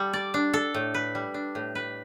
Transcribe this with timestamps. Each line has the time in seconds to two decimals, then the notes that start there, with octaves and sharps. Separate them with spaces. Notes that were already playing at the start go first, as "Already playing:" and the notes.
Already playing: G3 A4
0.13 D5
0.34 D4
0.54 A4
0.74 A2
0.94 B4
1.15 G3
1.34 D4
1.55 A2
1.75 B4